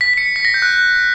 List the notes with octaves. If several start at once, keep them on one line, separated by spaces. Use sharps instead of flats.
B6
B6
C#7
B6
A#6
G6
F#6
F#6